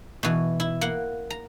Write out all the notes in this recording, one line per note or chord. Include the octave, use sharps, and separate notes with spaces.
B2 E3
E4
A#3 F#5
A#5